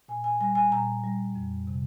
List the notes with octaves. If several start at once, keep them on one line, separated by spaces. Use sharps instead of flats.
A#2 G#5
G#5
G3 G#5
G#5
A#2 A#5
G3
F2
C3